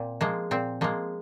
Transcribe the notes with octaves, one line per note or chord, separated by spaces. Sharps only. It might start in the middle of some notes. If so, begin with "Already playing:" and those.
Already playing: A#2 C4
F3 G#3 A#3
A#2 C4
F3 G#3 A#3